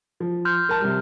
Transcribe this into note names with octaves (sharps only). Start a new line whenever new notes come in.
F3
C6 F6 G6
A#4 A5
C3 G3 F6